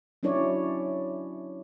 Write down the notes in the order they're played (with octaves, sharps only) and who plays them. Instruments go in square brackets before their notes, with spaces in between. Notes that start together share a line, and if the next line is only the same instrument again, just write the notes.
[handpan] F#3 C#4 D4 E4 C#5 D5